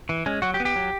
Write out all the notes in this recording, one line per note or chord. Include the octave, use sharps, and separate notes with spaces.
E3
G#3 C#4
F#3 F#4
G4
B3
G4
F#3